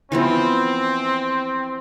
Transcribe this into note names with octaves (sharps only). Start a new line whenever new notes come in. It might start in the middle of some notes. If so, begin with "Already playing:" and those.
E3 F3 B3 C4